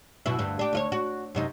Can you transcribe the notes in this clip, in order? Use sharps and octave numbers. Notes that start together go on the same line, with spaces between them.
F#2 B2 E4
D2 G2
D4 G4
D2 F4 C#5
F#4
F#2 C3 D#4